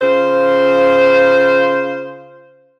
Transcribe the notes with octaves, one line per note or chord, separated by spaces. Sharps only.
C#3 F4 C5